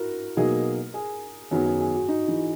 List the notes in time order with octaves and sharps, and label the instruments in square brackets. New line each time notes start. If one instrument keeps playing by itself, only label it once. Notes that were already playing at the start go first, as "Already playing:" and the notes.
Already playing: [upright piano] E4 F#4 A#4
[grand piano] B2 F#3 A#3 D#4 G#4
[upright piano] G#4
[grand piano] F#2 D#3 F#3 B3 [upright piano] G#4
[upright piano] G#4
G#4
F#4
D#4
E3